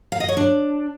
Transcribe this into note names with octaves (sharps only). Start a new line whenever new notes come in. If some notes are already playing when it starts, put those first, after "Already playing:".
F5
D#5
C#5
D4